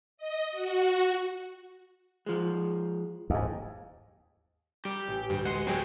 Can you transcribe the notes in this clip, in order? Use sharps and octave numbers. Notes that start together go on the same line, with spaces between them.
D#5
F#4
F3 G#3
D#2 G#2
G3 G4 A#4
A1
D2 G2
G#3 F#5 C6
F#3 G#3 B3 F#4 G5 G#5 E6 G#6